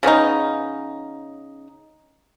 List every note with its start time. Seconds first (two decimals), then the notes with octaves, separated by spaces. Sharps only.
0.03 C#3 B3 C#4 D#4